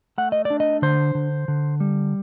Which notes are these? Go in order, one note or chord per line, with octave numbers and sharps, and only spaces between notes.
A3 F#5
D#5
D5
D4
D#5
D3 C5
D3
D3
G3